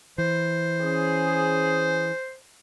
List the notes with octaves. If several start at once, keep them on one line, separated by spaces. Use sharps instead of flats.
E3 C5
C#4 G#4